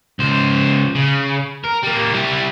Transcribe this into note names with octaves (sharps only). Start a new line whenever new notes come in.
C#2 C5
C#3
A#4
G3 A#3
G3 E4